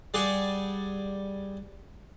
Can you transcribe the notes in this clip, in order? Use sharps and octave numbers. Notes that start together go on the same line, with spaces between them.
G3 G#4 D5 F#5